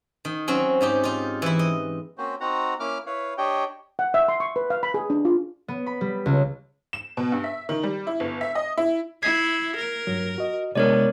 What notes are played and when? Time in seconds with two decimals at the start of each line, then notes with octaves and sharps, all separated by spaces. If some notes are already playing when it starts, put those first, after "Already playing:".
0.25 D#3
0.48 F#3 C4 C#4
0.81 G#2 D#4 G4
1.04 D#4 F4
1.42 E3 E4
1.59 D#5
2.18 A#3 C4 C#4 F#4 C5
2.40 C4 D#4 F#4 F#5 A#5
2.80 A#3 C#4 E4 D6 F6
3.06 E4 B4 C#5 F5
3.38 D4 G4 C#5 D#5 G5
3.99 F#5
4.14 E5
4.28 C6
4.40 C#6
4.56 B4
4.70 F5
4.83 B5
4.94 G#4
5.10 D4
5.25 F4
5.68 B3
5.86 B5
6.01 G3
6.26 C#2
6.93 E7
7.17 B2
7.32 G2
7.44 E5
7.69 D#3
7.83 G3
8.07 E4
8.20 G1
8.41 E5
8.55 D#5
8.78 E4
9.23 E4 G#6 B6 C7
9.76 A#4
10.07 G2 F#3
10.38 F#4 D#5
10.75 C3 G#3 B3 D4 A#4 C#5 D5